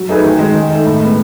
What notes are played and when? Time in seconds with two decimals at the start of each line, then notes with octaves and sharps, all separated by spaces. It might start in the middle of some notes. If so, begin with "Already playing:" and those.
Already playing: F#3
0.09 A3 D#4 G#4 B4
0.25 D#3
0.39 G#3 D#4
0.55 D#3
0.70 A3 D#4
0.85 A2
1.01 G#3 B3